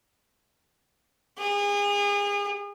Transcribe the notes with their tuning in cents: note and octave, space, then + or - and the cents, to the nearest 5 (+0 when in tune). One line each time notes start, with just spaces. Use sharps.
G#4 -35